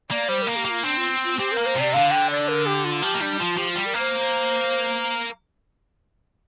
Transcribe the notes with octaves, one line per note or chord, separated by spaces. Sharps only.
A#3 D5
G3 C5
A#3 A#4
G4
A#3
F4
C4 D4
F4
F4
C4 G4
A#3 A#4
C5
C3
D5
D3 F5
G5
D5
A#4
G4
F4
F3 G4
A#3
G3 D4
F3 F4
F3 G4
G3 F4
A#4
A#3 C5